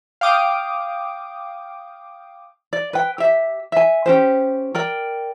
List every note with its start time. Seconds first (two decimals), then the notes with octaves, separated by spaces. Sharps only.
0.21 F5 G5 D6 D#6
2.73 D5
2.93 B4 G5
3.18 G4 E5
3.72 E5 G#5
4.06 C#4 G4 C5
4.75 A#4 D5 G5